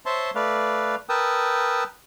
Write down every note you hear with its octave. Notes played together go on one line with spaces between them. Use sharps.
C5 C#5 E5 A5 C6
A3 B4 D5 F5
A#4 B4 G5 A5 D#6 E6